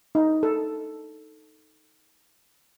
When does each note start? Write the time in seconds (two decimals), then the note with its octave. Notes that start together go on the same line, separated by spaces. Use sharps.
0.15 D#4
0.43 A4